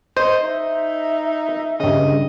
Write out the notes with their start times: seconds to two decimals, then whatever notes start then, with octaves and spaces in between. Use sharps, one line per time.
0.17 C5 D#5
0.43 D#4 E5
1.80 G2 C#3 D#5